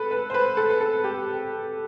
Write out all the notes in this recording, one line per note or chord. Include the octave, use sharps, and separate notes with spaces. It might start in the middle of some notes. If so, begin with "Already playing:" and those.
Already playing: A4 B4
B4
C5
B4
A4
B4
A4
G4